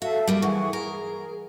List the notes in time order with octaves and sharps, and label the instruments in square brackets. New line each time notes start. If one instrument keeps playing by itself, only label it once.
[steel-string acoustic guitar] F#4 [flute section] A4 E5 F5
[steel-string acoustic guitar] G3 A#3 F#4
[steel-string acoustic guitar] E3 [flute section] G#4 F#5 C#6
[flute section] G#4 [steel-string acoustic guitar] A#4